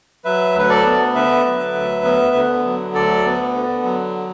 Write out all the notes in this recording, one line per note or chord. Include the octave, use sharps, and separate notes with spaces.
F#3 B4 E5
D2 B4
A4 D5
B3
D3 B4 E5
F#3
D2
B3
D3
F#3
D2 A4 D5
B3
D3
F#3